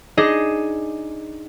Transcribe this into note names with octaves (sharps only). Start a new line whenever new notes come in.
D4 D#4 G#4 D#5